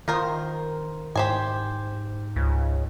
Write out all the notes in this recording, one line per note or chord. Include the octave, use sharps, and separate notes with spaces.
D#3 F4 A#4 C5
G#2 G4 C5 G#5
C#2